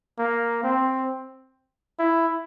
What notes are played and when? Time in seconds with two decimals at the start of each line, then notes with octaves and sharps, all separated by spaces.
0.19 A#3
0.63 C4
1.99 E4